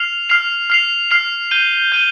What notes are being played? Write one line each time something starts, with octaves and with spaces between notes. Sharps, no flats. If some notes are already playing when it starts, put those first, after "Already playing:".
Already playing: F6 C7 F7
F6 C7 F7
F6 C7 F7
F6 C7 F7
G6 D#7 G7
G6 D#7 G7